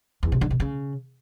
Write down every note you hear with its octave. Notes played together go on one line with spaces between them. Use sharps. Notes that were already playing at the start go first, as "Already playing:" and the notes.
E2
C3
D3
B2
C#3